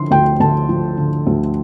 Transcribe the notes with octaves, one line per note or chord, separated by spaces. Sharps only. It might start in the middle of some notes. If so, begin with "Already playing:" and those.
Already playing: D3 F3 C6
D2 G5
D2 A5
F3
D3
D2